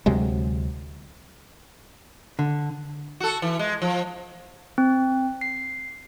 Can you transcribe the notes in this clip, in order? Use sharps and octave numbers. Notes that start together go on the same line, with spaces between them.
D2 C3 F#3 G#3
D3
F#4 A4
E3
G#3
F3
C4
C7